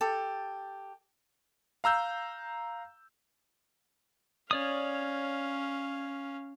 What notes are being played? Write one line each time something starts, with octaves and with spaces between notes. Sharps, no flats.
G4 A4
F5 A#5 E6 G6
C#4 C#5 D5 F5 D#6